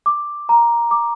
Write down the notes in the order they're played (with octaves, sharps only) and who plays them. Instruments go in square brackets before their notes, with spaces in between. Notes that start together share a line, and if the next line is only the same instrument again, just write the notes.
[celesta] D6
A#5
D6